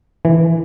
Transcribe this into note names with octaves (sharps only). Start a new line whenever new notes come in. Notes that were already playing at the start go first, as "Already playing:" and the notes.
E3